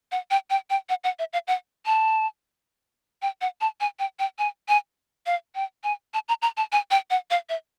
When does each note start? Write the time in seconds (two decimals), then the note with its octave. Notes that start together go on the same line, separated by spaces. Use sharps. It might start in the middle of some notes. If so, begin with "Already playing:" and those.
0.12 F#5
0.31 G5
0.50 G5
0.70 G5
0.89 F#5
1.04 F#5
1.19 E5
1.33 F5
1.48 F#5
1.86 A5
3.22 G5
3.41 F#5
3.61 A5
3.81 G#5
3.99 G5
4.19 G5
4.39 G#5
4.68 G#5
5.26 F5
5.55 G5
5.84 G#5
6.14 A5
6.28 A#5
6.42 A#5
6.57 A5
6.72 G#5
6.91 G5
7.10 F#5
7.31 F5
7.49 E5